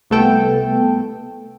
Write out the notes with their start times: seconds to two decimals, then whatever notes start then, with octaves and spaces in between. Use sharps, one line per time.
0.10 C2 A3 B3 A4 G5